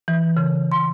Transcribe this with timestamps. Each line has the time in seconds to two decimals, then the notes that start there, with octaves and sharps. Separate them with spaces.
0.08 E3
0.37 C#3
0.72 C6